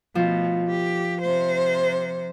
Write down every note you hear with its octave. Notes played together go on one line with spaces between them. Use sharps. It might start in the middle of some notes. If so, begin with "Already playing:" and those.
B2 F3 A3
G4
C3 C5